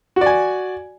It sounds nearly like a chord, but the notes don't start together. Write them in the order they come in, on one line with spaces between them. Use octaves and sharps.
F#4 D5 G#5